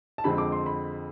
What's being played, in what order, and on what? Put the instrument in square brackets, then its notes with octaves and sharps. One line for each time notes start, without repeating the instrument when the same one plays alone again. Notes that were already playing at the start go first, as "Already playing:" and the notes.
[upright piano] A5
F2 D3 G#3 C4 B5
D6
C6
B5